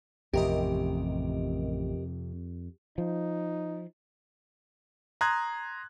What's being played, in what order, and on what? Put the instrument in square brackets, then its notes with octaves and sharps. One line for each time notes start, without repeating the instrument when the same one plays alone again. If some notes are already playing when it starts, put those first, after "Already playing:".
[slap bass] A1 [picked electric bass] F2 [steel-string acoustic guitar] C3 [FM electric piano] G4 A#4 D#5
[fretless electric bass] F3 [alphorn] D#4
[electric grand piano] A#5 C6 D#6 F#6 G#6